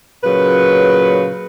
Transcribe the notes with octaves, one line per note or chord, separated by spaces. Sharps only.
A#2 C#3 F#3 B4